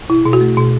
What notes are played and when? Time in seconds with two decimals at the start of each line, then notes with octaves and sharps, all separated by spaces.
0.09 B2 E4
0.25 B2
0.33 F#4
0.41 A3
0.57 B2